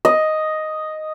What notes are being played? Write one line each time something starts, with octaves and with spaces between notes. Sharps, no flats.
D#5